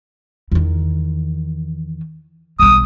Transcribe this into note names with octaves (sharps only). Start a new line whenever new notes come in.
E2 D#3
B1 G3 D#6